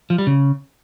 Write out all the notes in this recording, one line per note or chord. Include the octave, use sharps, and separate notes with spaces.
F3
G3
C#3